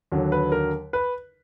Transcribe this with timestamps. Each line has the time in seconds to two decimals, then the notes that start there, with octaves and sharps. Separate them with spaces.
0.12 D#2 D3 F#3
0.32 B4
0.52 A#4
0.93 B4